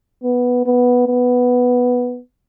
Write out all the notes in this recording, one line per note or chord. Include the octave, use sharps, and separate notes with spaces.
B3
B3
B3